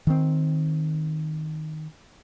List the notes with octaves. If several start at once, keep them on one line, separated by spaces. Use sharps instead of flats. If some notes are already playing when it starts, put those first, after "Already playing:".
D#3 C4